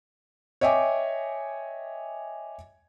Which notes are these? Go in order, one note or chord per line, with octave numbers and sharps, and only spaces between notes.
C#5 D#5 E5 G5 G#5 D6